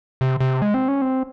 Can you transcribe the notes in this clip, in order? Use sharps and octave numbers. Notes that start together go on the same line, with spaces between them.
C3
C3
G#3
C4
C#4
C4